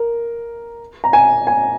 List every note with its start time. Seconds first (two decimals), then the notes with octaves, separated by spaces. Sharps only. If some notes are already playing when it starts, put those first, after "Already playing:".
Already playing: A#4
1.04 A#5
1.13 G#5
1.47 G#5